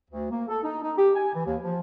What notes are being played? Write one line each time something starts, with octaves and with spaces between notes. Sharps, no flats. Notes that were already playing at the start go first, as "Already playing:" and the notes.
D2
A#3
A4
D#4
D#4
G4
G#5
E3
D#2
F3